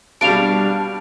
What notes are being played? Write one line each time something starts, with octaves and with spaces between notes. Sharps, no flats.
B2 G3 D4 F5 D7 F7